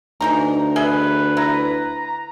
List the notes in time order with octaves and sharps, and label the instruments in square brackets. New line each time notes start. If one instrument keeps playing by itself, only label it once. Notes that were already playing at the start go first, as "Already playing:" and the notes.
[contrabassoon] D2 [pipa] E3 D#4 A#5
[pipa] G#4 D#5 E5 [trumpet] B4
[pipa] E4 [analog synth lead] A#5